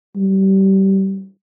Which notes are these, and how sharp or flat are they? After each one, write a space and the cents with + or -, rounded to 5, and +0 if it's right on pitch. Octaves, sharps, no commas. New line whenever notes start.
G3 -25